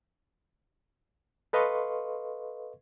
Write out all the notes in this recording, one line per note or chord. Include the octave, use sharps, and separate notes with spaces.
A4 B4 D#5 F5 C6 C#6